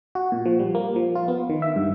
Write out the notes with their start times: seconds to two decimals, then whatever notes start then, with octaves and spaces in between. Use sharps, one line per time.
0.15 F#4
0.32 A#2
0.45 F3
0.59 G3
0.75 A#3
0.96 F3
1.15 F4
1.28 B3
1.50 D#3
1.62 E5
1.76 G2